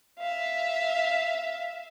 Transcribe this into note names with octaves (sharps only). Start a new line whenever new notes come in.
E5 F5